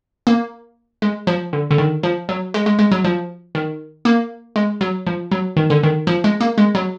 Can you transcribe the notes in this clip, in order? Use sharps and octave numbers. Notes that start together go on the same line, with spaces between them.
A#3
G#3
F3
D3
D3
D#3
F3
F#3
G#3
G#3
G#3
F#3
F3
D#3
A#3
G#3
F#3
F3
F#3
D#3
D3
D#3
F3
G#3
A#3
G#3
F#3